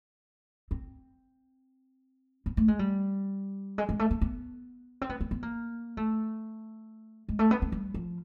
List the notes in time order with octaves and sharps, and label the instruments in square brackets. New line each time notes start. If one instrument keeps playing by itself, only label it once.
[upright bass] C4
B3
A3
G#3
G3
G#3
G#3
A3
A#3
B3
C4
B3
B3
B3
A#3
A3
G#3
A3
B3
C4
G3
F3